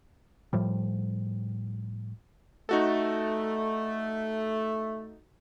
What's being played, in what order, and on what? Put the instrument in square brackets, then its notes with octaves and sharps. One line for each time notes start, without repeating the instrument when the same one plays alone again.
[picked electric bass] A2 F3 G3
[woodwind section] A3 [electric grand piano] D#4 F#4 A4